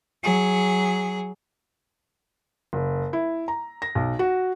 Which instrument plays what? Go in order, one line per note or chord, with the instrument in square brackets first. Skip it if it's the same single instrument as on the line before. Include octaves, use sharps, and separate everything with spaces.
[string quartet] F#3 G#4
[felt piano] F#1
E4
A#5
A#6
B1
F#4